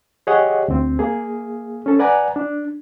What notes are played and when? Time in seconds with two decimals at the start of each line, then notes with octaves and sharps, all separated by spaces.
0.27 G4 G#4 C#5 D#5 F#5
0.68 D2 C4
0.99 A#3 G#4
1.86 C#4 A4
1.99 B4 D5 F#5 G#5 A#5
2.36 D4